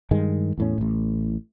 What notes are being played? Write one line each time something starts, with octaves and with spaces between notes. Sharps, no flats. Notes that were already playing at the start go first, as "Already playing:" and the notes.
G2 D#3 G#3
E2 A2 C#4
A1 A2